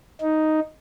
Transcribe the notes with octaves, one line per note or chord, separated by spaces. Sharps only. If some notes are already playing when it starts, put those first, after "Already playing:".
D#4